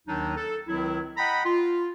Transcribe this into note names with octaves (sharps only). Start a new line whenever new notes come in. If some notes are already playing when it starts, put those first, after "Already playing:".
D#2 D#3 F#3 D4 D#4
A4
C#2 D#3 F#3 C4 E4
D#5 F#5 G5 A#5 B5
F4